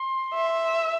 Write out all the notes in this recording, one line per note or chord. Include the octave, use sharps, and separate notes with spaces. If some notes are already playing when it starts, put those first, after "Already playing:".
Already playing: C6
E5